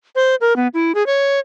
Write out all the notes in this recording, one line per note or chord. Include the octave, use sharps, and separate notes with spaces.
C5
A#4
B3
E4
G#4
C#5